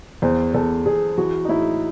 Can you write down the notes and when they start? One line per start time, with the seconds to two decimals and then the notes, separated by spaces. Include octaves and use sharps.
0.22 E2 C5
0.54 E2 A4
0.86 E2 G#4
1.17 E3 F#4
1.45 D#4
1.49 A2 E4